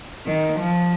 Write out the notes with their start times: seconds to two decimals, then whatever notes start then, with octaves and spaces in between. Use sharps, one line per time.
0.26 D#3
0.59 F3